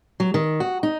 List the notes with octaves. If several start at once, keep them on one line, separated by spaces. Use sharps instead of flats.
F#3
D#3
F#4
D#4